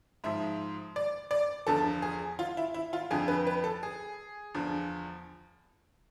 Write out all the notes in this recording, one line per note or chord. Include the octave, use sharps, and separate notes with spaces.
G#2 F3 E5
D5
D5
E2 D3 F3 A4
G#4
F4
E4
E4
F4
F2 D3 F3 G#4
B4
B4
A4
G#4
E2 D3 F3